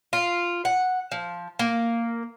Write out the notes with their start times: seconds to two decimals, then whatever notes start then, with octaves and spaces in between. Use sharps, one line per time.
0.13 F4
0.65 F#5
1.12 F3
1.59 A#3